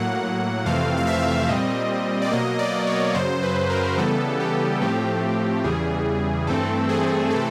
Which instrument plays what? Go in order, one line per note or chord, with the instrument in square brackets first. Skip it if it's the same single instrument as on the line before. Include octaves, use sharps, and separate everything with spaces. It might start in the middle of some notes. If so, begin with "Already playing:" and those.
Already playing: [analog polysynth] A2 F#3 A#3 F#5
F2 C3 E3 A3 C4 F5
F5
E5
A#2 G3 C4 D#5
D5
B2 F#3 A#3 D#5
D5
C#5
F#2 C#3 F#3 C5
B4
A#4
C#3 E3 G3 B3 A4
G4
A2 F3 A3 C4 G4
E2 C#3 E3 G3 G#4
G2 E3 A3 C4 A4
G#4
C3 E3 A3 C4 A4